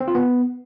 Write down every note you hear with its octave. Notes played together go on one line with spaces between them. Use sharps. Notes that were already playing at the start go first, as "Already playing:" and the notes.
C4
F4
B3